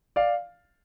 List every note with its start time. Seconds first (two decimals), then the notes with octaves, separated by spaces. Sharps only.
0.16 D5 F5